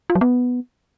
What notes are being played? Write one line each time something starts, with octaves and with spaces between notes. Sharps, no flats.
F4
F#3
B3